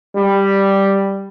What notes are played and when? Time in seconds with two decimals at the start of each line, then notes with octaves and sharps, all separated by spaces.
0.15 G3